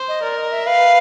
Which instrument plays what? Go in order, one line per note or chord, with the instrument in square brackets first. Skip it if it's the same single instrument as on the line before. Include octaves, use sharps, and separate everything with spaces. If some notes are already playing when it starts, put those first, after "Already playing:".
Already playing: [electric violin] C5
[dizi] D#5
[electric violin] A#4 [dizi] D5
[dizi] D#5
E5
[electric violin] B4 [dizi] F5